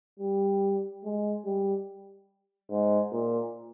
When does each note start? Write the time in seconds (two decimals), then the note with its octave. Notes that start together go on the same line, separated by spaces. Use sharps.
0.20 G3
1.04 G#3
1.45 G3
2.71 G#2
3.12 A#2